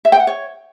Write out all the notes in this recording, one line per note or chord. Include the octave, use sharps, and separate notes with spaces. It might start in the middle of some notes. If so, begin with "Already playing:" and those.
E5
G5
F#5
C#5